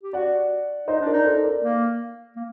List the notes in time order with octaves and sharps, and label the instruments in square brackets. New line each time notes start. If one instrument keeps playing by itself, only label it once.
[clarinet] G4
[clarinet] F#4 [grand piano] D5 F#5
[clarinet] D#4 [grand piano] C5 D#5
[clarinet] D4
[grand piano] A#4 D5
[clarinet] D#4
[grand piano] A4 C5
A#4 D5
[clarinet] A#3
A#3